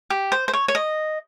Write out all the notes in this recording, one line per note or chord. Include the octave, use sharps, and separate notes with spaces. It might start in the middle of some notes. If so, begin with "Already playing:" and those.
G4
C5
C5
C#5
C#5
D#5